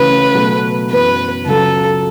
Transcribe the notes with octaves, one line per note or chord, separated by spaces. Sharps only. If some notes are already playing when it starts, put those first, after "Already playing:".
Already playing: C#3 E3 A3 C#4 F#4 B4
B2 F#3 A3 F#4 A4
F#2 E3 B3 B4
C#2 C#3 F#3 A4